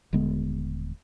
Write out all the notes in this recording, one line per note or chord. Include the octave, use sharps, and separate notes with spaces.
D#1 D3 G#3 B3